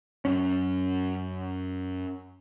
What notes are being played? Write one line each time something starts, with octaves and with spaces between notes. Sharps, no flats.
F#2 C#4